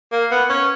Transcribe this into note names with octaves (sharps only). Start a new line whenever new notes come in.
A#3
B3
C#4